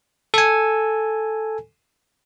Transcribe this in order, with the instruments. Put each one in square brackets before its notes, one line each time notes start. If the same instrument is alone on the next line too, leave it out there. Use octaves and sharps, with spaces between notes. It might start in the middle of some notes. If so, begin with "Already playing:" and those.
[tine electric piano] A4 G#5